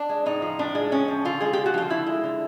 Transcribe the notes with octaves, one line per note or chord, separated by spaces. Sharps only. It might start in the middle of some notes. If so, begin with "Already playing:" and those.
Already playing: D4
G#3
A2 D#4
F3
A2 D4
G#3
A2 C#4
F3
D3 F4
G#3 G#4
D3 G4
F#4
F3 F4
D3 E4
G#3
D3